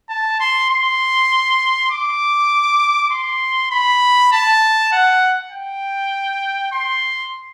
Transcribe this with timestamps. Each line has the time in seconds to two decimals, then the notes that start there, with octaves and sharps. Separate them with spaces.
0.09 A5
0.40 C6
0.70 C6
1.91 D6
3.11 C6
3.71 B5
4.32 A5
4.92 F#5
5.51 G5
6.72 C6